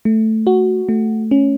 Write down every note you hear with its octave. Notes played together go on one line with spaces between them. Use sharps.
A3
F#4
A3
C#4